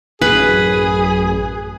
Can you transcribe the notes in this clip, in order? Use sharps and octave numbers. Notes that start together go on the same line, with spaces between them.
A1 F#2 G#4 B4